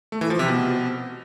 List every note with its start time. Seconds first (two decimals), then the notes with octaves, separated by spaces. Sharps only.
0.12 A3
0.21 E3
0.30 F3
0.39 C3
0.48 B2